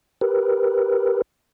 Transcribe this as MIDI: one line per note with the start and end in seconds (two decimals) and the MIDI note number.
0.21 1.22 67
0.21 1.22 70
0.21 1.22 71